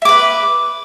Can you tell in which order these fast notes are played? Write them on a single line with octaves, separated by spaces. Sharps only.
E5 D6 B4